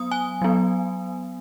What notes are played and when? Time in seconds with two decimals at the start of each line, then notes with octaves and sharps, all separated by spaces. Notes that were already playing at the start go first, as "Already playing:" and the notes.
Already playing: F#3 B3 D#6
0.11 G#5
0.42 F#3 B3